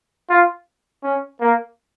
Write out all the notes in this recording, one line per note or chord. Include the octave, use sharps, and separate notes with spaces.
F4
C#4
A#3